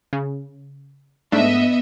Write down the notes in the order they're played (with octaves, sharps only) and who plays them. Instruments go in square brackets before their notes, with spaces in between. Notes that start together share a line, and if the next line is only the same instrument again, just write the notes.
[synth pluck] C#3
[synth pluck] G#2 A3 D4 [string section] B3 D#5 E5